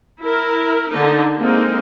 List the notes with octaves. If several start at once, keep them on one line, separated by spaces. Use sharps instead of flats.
E4 A#4
D3 D#4
G#3 A#3 C4 D#4